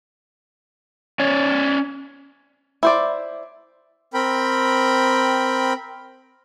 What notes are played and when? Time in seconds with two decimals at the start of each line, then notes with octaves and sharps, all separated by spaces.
1.20 C#4 C#5 D5
2.83 E4 C5 D5
4.14 C4 A#4 G5 B5